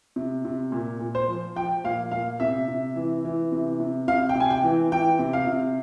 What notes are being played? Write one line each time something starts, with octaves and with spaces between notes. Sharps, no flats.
C3
C3
A#2
A#2
C5
F3
F3 G5
A#2 F5
A#2 F5
C3 E5
C3
E3
E3
C3
C3
C3 F5
G5
C3
G#5
G5
E3
E3 G5
C3
F5
C3